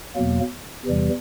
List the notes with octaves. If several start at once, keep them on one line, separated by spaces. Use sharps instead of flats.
E2 B2 F#3 A#3
E2 C3 E3 G3